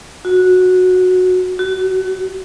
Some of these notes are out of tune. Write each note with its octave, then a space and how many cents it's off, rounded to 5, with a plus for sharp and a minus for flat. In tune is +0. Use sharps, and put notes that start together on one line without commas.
F#4 -10
F#4 +30